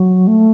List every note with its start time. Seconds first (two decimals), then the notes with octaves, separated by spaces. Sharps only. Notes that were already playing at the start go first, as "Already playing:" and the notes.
Already playing: F#3
0.27 A3